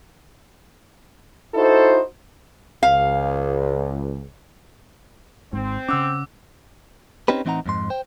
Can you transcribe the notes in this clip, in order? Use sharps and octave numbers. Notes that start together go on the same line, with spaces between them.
D#4 E4 F#4 A4 C5
C#2 F5
G#1 G#2 C4
C#3 C#4 F#5 D6 E6
C4 C#4 D#4 G4 B4
A2 E3 C4 D#4 F#5 A#5
F2 G#2 C6
C5 G5